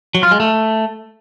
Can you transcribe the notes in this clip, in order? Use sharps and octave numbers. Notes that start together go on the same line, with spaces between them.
F#3
F4
G#3
A3